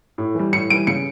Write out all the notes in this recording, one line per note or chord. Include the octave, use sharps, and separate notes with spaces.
A2
E3 G3
A2 C#7
E3 G3 D7
C#3 C#7